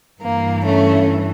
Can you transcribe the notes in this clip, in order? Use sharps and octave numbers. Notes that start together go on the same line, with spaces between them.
G2 E3 A#3
A3 C#4